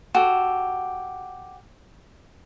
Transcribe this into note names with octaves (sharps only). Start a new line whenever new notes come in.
F#4 G4 A4